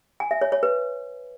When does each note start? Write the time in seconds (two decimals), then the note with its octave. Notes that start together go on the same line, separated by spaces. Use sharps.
0.20 G#5
0.31 E5
0.41 C#5
0.52 C#5
0.63 B4